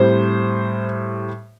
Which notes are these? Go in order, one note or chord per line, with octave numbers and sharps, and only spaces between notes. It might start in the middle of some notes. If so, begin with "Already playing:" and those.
Already playing: A2 G3 C4 C5